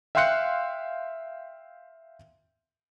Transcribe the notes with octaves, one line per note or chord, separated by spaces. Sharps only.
E5 F5 G5 C6 F#6 C#7